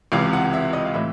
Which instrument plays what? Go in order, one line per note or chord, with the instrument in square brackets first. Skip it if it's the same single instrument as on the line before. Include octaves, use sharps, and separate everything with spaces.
[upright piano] C#2 C3 E3 F5
F#5
E5
D#5
F5
A2 E3 E5